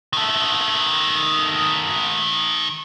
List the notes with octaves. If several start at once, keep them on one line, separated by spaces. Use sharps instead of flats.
D#3 A4